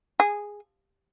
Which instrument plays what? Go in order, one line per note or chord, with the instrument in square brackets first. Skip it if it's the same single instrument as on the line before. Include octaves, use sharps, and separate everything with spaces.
[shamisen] G#4